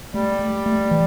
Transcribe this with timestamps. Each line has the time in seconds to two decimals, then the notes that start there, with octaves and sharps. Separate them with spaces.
0.13 G3 A3
0.39 A3
0.66 A3
0.91 E3